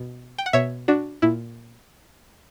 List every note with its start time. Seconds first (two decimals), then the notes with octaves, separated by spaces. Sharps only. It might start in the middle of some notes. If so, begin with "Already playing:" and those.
Already playing: B2
0.38 G5
0.46 F#5
0.53 B2 C#5 E5
0.88 D4 F#4
1.22 A#2 E4